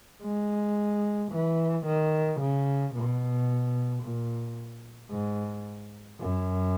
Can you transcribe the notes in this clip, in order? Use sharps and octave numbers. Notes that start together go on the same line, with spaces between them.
G#3
E3
D#3
C#3
B2
A#2
G#2
F#2